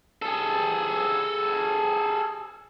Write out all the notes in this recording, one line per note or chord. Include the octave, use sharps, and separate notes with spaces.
G#4 A4